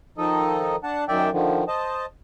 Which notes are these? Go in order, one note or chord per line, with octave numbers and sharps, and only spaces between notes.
D#3 F3 D#4 A4 D#5
D4 F#5 A5
F#2 D#3 D5 E5 G5
D3 D#3 F3
C5 D#5 A5